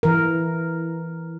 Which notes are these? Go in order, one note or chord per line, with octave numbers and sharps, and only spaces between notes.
E3 A#4